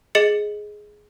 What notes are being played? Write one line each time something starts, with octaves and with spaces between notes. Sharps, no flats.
G#4 D#5 A6 C#7 F#7